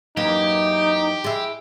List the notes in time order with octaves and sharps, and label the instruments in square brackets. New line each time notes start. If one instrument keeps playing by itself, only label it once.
[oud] F#2 E3 A#3 [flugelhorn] D#4 [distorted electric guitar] G4
[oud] G#3 E4